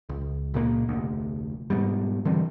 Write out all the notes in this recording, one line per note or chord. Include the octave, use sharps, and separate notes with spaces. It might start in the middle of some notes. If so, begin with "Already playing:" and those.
C#2
C#2 A#2 G#3 A#3
F1 D2
G#2 B2 G3
D3 E3 G3 C4